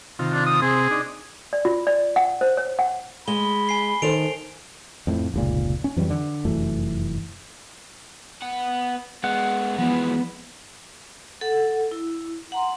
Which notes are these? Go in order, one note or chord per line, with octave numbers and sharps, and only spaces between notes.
C3 D#3 F4
D4
D#6
C3 C4 G#4
D4 D#4
D5
F4
D5
F#5
C5
C#5
F#5
G#3 B5 G7
G#5 C7 G7
D#3 A4 C5 D7 F7
F2 A2
F1 C#2 A#2
C#4
F2 E3 F#3 G3
D3
F1 F#2 E3 A3
B3 F#5
G#3 B3 F#5
E3 F3 G#3 B3
A4 F#5
E4
F#5 A#5 C6